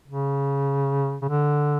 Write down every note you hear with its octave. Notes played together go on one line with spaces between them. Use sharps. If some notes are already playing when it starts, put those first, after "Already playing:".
C#3
C#3
D3